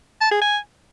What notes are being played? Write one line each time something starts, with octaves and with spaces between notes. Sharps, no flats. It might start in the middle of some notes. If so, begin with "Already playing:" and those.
A5
G#4
G#5